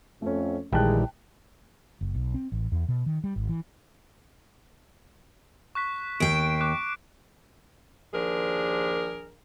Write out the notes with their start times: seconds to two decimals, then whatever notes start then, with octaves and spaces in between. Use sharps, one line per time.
0.22 F2 A3 C#4
0.73 A#1 D#3 E3 G3 G#3 G5 A5 F#6
2.01 F#1
2.15 B1
2.34 C4
2.52 A1
2.72 E2
2.88 B2
3.06 D#3
3.24 G3
3.36 G#1
3.49 E3
5.75 C#6 F#6 B6
6.20 D#2 G5 C7 D7
6.61 C#6 D6 F#6
8.14 D#2 F3 D4 G#4 A#4